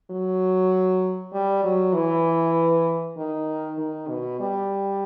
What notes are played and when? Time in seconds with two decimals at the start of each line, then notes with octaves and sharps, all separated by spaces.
0.10 F#3
1.33 G3
1.63 F#3
1.94 E3
3.17 D#3
3.78 D#3
4.09 B2
4.40 G3